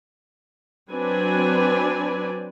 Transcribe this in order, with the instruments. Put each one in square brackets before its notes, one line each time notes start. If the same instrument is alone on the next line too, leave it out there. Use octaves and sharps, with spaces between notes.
[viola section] F#3 C4 D4 B4 D5 G#5